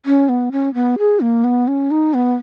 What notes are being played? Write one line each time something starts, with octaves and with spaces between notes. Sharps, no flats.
C#4
B3
C#4
B3
G#4
A#3
B3
C#4
D#4
B3